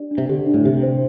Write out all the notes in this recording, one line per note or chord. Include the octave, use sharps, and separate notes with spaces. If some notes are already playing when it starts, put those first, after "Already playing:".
Already playing: D4 G4 D5
D4
C3
D3 G4
D4
A2
C3 G4
C5